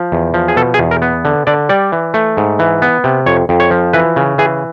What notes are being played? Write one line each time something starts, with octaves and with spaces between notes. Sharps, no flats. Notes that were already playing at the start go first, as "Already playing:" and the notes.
Already playing: F3
E2
F3
G#4
B2 A4
G#4
E2
A#4
B3
D3
D3 D5
G3 D5
E3
A3
G#2
E3
B3
C3
F2 C#5
F2
C#5
F3
E3 B4
C#3
E3 G#4